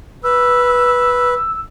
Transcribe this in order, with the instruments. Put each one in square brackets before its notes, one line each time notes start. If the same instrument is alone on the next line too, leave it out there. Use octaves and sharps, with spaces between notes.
[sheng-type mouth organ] B4 [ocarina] E6